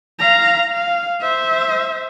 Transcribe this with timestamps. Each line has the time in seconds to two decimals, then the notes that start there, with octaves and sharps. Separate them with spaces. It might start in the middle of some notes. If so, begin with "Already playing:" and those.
0.19 F5 A#5
0.71 F5
1.21 C5 E5